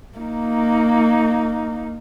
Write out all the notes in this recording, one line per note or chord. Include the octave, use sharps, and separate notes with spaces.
A#3 D#4